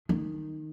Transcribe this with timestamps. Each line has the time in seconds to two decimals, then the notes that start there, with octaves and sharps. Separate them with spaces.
0.09 D#3